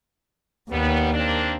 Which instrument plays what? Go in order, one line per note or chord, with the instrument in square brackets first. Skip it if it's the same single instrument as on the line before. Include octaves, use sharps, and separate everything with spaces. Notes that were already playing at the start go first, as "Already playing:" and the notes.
[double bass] D#2 [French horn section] G3 B3
[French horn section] A#3 C4 D4